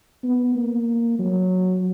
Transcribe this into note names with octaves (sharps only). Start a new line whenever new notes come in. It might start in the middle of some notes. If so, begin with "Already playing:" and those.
B3
A#3
F#3